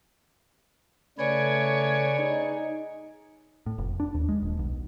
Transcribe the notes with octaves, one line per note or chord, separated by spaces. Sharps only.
C#3 A3 B4 C#5 D5 G#5
D#4 G#4
A2
F1
D4
D#2
G#3
D#1
B1